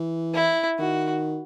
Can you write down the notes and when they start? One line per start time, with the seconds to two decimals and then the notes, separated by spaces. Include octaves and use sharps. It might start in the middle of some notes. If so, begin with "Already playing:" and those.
Already playing: E3
0.35 E4
0.79 D#3 F#4